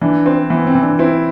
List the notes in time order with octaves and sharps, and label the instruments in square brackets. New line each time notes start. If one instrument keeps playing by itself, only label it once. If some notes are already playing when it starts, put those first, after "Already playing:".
[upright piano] E3 [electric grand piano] D4
[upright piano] C4
[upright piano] E3 [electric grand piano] B3
[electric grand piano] C4
[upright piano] E3
[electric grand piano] D4
[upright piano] C4 [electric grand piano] E4